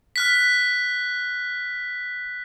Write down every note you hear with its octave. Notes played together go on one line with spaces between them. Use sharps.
F6 F#6 B6